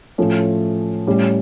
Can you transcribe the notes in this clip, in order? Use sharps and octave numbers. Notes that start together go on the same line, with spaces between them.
A2 F3 A3 C#4
A2 G3 C#4